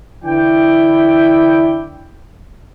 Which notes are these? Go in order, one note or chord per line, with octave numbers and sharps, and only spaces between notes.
D3 E3 E4 D5 G5